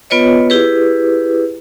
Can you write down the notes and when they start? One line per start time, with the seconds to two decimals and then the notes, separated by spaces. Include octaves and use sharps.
0.10 B3 F4 B4 C#5 D#5
0.50 E4 G4 G#4 B4